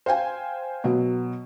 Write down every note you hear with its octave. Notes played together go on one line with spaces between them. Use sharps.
C5 F5 G5 G#5
B2 F#3